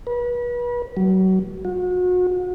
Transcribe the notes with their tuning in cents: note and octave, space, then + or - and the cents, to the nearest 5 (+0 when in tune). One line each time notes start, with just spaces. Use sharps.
B4 -35
F#3 +30
F#4 -35